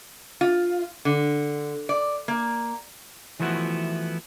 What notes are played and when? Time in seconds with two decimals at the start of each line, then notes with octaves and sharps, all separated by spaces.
0.41 F4
1.05 D3
1.89 D5
2.28 A#3
3.40 E3 F3 A3 B3 E4 F#4